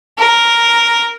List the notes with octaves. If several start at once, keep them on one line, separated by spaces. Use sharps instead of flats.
A#4